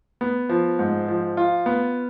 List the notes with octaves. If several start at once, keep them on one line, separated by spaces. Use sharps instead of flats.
B3
F3
G#2
F3
F4
B3